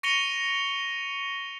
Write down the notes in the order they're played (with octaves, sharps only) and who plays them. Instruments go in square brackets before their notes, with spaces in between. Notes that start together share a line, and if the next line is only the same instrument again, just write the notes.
[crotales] C#6 A#6 C#7 D#7 F7 G7